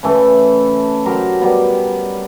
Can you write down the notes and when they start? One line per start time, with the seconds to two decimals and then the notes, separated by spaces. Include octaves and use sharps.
0.03 C#3 E3 A3
1.06 F#3 G4 A#4 C5
1.41 G3 B3